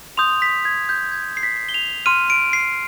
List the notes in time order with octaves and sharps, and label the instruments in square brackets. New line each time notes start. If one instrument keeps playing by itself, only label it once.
[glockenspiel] C6 D#6 G6 F7
B6
G#6
G6
G#6
C7
B6
G7
F7
C6 F6 D#7
D7
C7